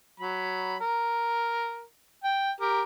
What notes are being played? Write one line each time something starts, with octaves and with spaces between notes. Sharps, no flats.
F#3 B5
A#4
G5
G4 A#4